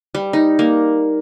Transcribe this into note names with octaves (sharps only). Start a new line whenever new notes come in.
G3
D#4
A#3